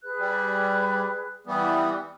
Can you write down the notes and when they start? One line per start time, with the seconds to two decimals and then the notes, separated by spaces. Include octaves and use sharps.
0.03 G#4 B4 F#6
0.19 G3
1.47 E3 G3 B3 E4 D#6